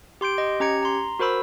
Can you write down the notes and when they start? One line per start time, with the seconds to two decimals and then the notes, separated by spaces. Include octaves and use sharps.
0.21 G4 C6 G6 D7
0.38 D#5
0.60 C#4 G4 A#5 G#6 C#7
0.83 A#5 C6
1.19 F#4 A#4 C5 B5 E6